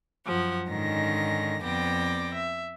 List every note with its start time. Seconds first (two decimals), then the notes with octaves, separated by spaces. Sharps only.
0.25 F#2 F3 F#5
0.67 G#2 D3 D#3 C#4 A#6
1.63 F2 B3 C4 D5 G5 A#6
2.33 E5